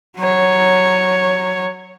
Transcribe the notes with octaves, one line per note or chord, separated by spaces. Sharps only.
F#3 C#5